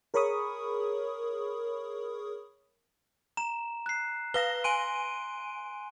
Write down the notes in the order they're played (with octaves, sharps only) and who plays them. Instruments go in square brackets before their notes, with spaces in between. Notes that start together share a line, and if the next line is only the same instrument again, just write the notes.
[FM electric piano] G#4 A#4 C#5 B5 C#6 D#6
[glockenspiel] A#5 E7
F#6 C7
[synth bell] B4 F5 A#6 [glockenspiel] G7
[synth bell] G#5 D7 D#7 [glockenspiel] C6